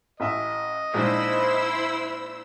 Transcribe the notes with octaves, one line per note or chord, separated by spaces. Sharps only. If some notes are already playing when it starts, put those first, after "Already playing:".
A1 D#5 E5
A#1 G#3 D#4 E4 C5 E6